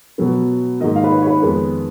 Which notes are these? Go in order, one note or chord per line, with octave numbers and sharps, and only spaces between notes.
B2 F#3 B3
G#2 D#3 A#3 D#5
F5
B4
C#5
C#5
B4
F2 D#3 G#3 B3